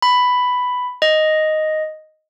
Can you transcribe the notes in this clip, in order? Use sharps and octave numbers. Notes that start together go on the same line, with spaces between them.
B5
D#5